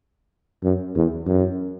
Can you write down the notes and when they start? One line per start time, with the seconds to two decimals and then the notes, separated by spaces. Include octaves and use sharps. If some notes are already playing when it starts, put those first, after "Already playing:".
0.64 F#2
0.96 E2
1.26 F#2